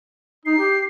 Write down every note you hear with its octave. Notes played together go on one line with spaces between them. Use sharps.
D#4 C7
G4